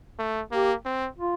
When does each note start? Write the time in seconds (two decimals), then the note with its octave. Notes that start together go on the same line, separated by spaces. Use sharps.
0.19 A3
0.52 A#3 G4
0.85 C4
1.18 F4